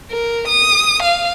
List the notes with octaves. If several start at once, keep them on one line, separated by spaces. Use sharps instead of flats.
A#4
D#6
F5